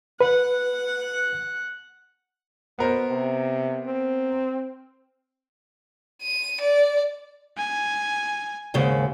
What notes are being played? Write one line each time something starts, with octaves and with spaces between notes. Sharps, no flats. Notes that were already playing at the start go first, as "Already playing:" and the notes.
B4 F#5
B2 B3 A#4 C5
C3
C4
D#7
D5
G#5
D#2 G#2 C#3